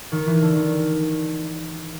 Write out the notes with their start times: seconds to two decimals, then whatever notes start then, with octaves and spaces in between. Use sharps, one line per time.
0.12 D#3
0.26 E3
0.41 D3
0.56 D#3